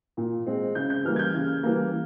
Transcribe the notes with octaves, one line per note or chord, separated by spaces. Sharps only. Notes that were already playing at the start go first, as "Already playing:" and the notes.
A#2
G#3 C4
C#3 G6
G6
E3 G3 A#3 F6
G#6
G6
C#3 G#6
E3 G3 A#3